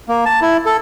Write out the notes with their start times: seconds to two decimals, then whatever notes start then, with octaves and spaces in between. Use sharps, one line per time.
0.08 A#3
0.26 A5
0.41 E4
0.66 A4